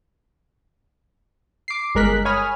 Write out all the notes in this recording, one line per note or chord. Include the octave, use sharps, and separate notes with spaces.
D6 C7
G1 G#3 A#4 F#6 B6
C#5 G#5 B5 D#6 F6